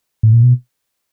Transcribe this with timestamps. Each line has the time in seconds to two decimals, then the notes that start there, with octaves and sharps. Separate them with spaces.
0.23 A2
0.33 A#2
0.43 B2